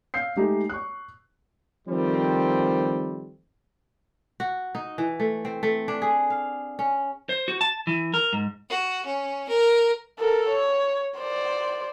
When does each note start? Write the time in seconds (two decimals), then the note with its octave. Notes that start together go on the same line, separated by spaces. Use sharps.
0.14 F5 E6 G6 C7
0.36 G#3 A3 D#4 G4 G#4
0.70 C#6 F#6
1.87 D#3 F3 G3 A3 C4
4.40 F#4
4.75 D#4
4.98 E3
5.20 A3
5.45 C4
5.63 A3
5.88 D4
6.02 G#4
6.30 F5
6.79 C#4
7.29 C5
7.48 F#4
7.61 A5
7.87 E3
8.14 A#4
8.33 G#2
8.69 F#4
9.06 C#4
9.49 A#4
10.19 A4 A#4
10.49 C#5
11.18 C5 D5